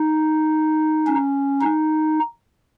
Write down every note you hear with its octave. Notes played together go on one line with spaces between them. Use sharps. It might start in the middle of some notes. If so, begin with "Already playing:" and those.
Already playing: D#4
C#4
D#4